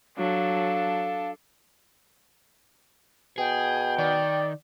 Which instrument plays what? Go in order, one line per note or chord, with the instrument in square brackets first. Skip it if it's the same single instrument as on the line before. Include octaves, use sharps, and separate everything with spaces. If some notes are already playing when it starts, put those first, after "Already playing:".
[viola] F#3 [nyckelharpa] D4 A4 [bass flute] F5
[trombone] B2 [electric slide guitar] G#4 [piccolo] G5
[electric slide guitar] D#3 [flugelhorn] D5